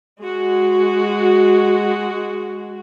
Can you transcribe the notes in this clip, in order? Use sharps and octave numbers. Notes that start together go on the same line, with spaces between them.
G#3 F#4